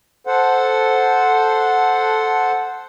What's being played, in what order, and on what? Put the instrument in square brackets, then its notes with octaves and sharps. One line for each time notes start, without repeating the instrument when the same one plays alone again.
[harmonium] A4 C5 F#5